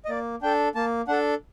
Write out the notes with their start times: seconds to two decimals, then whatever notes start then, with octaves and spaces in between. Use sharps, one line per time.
0.05 D#5
0.09 A#3 D5
0.42 D4 A4 G5
0.75 A#3 A5
1.08 D4 A4 F#5